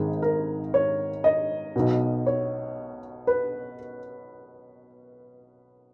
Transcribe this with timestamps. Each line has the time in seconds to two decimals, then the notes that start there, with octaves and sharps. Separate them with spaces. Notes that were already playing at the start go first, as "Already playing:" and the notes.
Already playing: G#1 G#2 D#3 G#4
0.22 A#4
0.74 C#5
1.24 D#5
1.76 B1 B2
2.27 C#5
3.27 B4